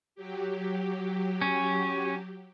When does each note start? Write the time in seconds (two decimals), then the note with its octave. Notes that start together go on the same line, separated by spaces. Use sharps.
0.15 F#3 G4
1.41 C#4